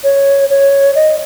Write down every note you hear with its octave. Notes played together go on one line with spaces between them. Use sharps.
C#5
C#5
D#5